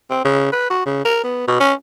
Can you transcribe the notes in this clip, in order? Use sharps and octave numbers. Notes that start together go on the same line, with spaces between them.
C4
C#3
B4
F#4
C#3
A#4
B3
B2
C#4